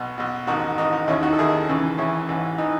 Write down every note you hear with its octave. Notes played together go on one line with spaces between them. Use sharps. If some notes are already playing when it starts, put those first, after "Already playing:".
Already playing: B1 B2
B1 B2
A1 G#2 D#3 D#4 F#4
A1 G#2 D#3 D#4
D#4
D#2 D#3 C#4 E4
D#4 F#4
A4
D#2 D#3 E4 G#4
C#2 C#3 E3
C#2 C#3 E3 C#4 E4
A1 G#2 E3
E3 D#4